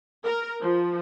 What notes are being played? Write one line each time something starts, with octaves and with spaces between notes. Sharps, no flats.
A#4
F3